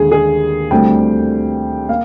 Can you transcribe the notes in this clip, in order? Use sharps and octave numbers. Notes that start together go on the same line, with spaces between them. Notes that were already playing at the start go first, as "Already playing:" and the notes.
Already playing: D#2 D3 G#3 G#4
G#4
D2 D3 G3 C4 G5
A#3 F5